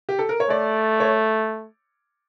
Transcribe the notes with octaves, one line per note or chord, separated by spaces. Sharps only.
G4
A4
A#4
C#5
A3 D5
C#5